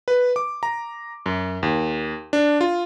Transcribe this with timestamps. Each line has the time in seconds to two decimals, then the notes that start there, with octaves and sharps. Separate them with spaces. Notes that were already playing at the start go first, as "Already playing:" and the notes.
0.08 B4
0.36 D6
0.63 A#5
1.26 F#2
1.63 D#2
2.33 D4
2.61 F4